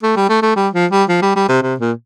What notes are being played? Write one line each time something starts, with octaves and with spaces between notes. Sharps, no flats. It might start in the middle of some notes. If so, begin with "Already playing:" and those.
A3
G3
A3
A3
G3
F3
G3
F3
G3
G3
C3
C3
A#2